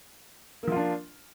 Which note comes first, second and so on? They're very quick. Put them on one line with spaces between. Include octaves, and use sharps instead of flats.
A#3 F3 F4 D4